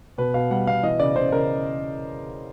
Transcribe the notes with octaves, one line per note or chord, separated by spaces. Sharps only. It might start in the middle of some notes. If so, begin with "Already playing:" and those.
B2 B4
B2 F5
G3 F#5
B2 F5
E3 D#5
C#3 D5
C#3 C5
C#3 A#4